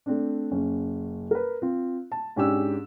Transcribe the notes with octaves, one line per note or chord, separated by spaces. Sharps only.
A3 C4 D4
F#1 C#4
A#4 B4
C4 F4
A5
G#2 C#4 D4 G4 G#4 E6